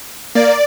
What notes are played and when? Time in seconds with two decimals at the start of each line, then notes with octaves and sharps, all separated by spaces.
0.35 A#3 D5